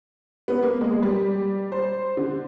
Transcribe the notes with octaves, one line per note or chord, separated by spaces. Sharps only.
B3
A#3
G#3
G3
C5
D3